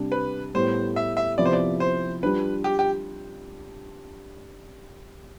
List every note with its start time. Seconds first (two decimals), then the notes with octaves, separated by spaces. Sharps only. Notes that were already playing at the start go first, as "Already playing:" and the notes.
Already playing: C3 G3 D4 G4
0.12 B4
0.54 A2 G3 B3 C5
0.96 E5
1.17 E5
1.38 C3 F3 B3 E4 G4 D5
1.46 C5
1.53 D5
1.80 C5
2.23 G3 D4 F4 B4
2.64 G4
2.79 G4